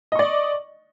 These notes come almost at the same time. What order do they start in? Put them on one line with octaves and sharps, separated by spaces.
D#5 C#6 D5